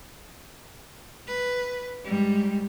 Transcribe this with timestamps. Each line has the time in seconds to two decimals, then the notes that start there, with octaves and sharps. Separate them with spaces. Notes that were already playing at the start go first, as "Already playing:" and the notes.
1.27 B4
2.04 G#2 G3